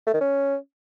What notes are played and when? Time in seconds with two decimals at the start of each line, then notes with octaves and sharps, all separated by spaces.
0.07 A3
0.14 D#3
0.21 C#4